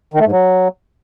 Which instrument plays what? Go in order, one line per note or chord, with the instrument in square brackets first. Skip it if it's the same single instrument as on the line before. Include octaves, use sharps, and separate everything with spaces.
[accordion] D#3
A3
G#2
F#3